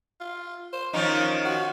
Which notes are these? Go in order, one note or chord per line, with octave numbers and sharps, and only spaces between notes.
F4
C5
D#3 F3 C#4 D#4
F#4